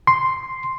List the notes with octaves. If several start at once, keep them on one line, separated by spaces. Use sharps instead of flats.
C6